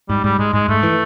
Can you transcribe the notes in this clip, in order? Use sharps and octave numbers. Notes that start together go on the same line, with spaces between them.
G#2 G3
G#2 G3
G#2 G#3
G#2 G#3
G#2 A3
E3